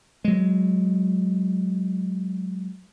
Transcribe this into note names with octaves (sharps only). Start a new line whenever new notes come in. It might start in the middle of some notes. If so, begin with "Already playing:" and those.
F#3 G#3